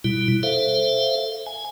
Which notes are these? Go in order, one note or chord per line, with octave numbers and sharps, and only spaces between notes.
B2 G3 E4
A4 C5 E5 F5
G#5